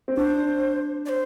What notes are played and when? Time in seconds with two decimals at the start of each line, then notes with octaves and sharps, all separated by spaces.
0.08 C4
0.17 D4 C5
1.05 D5
1.09 C5